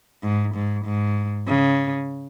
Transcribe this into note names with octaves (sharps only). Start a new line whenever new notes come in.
G#2
G#2
G#2
C#3